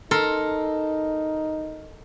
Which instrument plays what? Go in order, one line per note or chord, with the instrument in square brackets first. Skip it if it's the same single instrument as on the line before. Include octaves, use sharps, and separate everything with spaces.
[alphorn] D#4 [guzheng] A4 A#4 C6